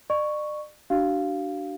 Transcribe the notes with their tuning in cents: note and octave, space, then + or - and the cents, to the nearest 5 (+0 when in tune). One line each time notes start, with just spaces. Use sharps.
D5 +40 C#6 +0
D4 +0 F#4 +35 F5 +0